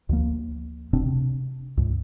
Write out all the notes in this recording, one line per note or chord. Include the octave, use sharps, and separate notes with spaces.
D2 F3 A#3
F1 B2 C4 D4
C3
C#2 G#2